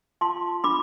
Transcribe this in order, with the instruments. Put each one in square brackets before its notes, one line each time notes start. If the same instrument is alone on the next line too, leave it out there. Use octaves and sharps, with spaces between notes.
[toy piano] F4 A5 C6
D4 B5 D6